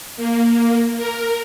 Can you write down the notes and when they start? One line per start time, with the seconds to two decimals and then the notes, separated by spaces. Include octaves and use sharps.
0.17 A#3
0.96 A#4